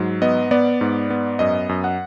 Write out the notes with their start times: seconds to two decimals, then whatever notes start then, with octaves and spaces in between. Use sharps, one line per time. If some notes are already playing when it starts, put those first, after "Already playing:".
Already playing: G#2 F#3
0.22 B3 D#5
0.51 B3 D5
0.81 G#2
1.10 B3
1.39 F#2 D#5
1.69 F#2
1.84 F#5